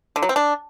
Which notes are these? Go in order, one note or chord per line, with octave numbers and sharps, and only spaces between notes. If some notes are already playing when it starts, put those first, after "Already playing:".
D3
F#3
C4
D4